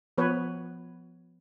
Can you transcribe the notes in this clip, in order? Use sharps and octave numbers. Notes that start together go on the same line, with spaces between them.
F3 B3 B4 C#5